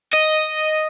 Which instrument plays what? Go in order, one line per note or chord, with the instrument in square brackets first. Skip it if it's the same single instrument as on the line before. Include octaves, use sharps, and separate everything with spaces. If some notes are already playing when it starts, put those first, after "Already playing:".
[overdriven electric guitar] D#5